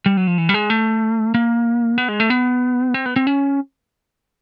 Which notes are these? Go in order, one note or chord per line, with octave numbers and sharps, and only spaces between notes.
G3
F#3
F3
E3
G3
G#3
A3
A#3
B3
G#3
A3
B3
C4
B3
C4
C#4